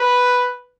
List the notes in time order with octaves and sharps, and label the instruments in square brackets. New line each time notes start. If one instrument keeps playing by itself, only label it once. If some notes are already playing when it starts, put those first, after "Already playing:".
Already playing: [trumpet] B4